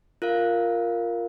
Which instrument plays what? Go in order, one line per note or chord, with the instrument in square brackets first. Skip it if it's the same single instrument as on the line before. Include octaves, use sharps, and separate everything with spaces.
[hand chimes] F4 A#4 F5